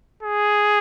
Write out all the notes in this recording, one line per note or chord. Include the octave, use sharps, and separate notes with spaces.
G#4